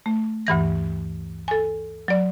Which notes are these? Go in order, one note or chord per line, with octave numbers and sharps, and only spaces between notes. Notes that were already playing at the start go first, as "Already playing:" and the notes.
A3
D2 G2 E3 A#6
A4 G#5
F#3 D5